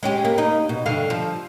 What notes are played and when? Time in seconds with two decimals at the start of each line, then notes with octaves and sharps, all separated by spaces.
0.03 G#3 C#4 G4
0.25 A#3
0.38 D#4
0.69 B2
0.86 G2 D3 F5
1.10 F3